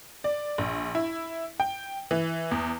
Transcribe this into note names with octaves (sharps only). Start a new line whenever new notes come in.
D5
A#1
E4
G5
E3
E2